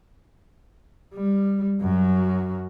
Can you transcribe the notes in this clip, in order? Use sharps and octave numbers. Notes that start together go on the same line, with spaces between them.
G3
F#2 F#3